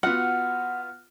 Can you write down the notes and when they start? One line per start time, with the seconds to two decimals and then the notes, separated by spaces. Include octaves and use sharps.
0.03 B3 F4 F#4 F#5 F6